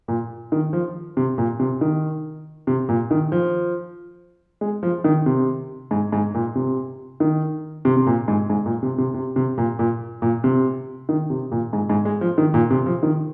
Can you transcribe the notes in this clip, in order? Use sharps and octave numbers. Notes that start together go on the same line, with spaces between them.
A#2
D#3
F3
C3
A#2
C3
D#3
C3
A#2
D#3
F3
G#3
F3
D#3
C3
G#2
G#2
A#2
C3
D#3
C3
C3
A#2
G#2
G#2
A#2
C3
C3
C3
C3
A#2
A#2
A#2
C3
D#3
C3
A#2
G#2
G#2
G#3
F3
D#3
A#2
C3
F3
D#3